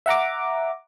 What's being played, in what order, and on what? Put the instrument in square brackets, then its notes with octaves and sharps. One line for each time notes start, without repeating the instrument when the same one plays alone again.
[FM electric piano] E5 F#5 A#5 D6